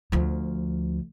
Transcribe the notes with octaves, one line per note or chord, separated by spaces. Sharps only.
D2 F3